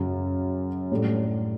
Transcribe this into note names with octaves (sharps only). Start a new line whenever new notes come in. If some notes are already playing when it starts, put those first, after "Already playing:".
Already playing: F#2 C#3 F#3 C#4
A2 G3 D4 A4